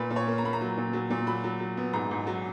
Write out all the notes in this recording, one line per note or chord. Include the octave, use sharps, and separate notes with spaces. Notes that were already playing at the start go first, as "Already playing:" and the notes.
Already playing: A#2 B4
A#2
C#5
A#3
A#5
A#3 B5
A#5
F#3
A#2
F#3
A#2
F#3 B5
F#3
F#3
B3
G#2 A#5
G#2
F#3